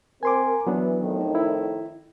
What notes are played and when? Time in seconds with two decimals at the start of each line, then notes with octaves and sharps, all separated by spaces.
0.23 C4 A#4 G#5 C6 D6
0.67 E3 F#3 B3 D4
1.00 F2 A2 D#3
1.35 E4